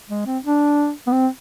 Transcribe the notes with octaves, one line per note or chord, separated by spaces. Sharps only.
G#3
C4
D4
B3
C4